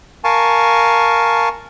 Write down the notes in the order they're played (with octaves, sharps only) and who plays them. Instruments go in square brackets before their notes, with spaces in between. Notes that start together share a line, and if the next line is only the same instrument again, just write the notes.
[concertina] A#4 F5 G#5 A5 C#6